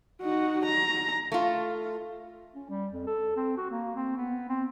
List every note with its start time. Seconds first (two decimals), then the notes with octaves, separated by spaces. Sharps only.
0.22 D#4 F#4
0.66 A#5
1.32 A3 F4
2.55 C#4
2.70 G3
2.93 F2
3.07 A4
3.36 C4
3.57 F#4
3.70 A#3
3.95 C4
4.17 B3
4.49 C4